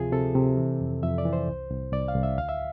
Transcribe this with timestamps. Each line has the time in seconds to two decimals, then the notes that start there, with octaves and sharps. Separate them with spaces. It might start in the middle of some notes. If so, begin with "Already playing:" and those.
Already playing: D2 C3 F3 F4 G#4
0.12 C3 A4
0.35 C3
0.57 E3
0.80 F2
1.03 F2 E5
1.18 D5
1.25 E3
1.33 C5
1.48 C2
1.71 C2
1.92 C2 D5
2.08 F5
2.15 C2
2.23 E5
2.38 D2 F5
2.49 E5